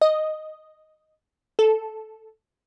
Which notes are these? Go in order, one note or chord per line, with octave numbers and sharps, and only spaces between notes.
D#5
A4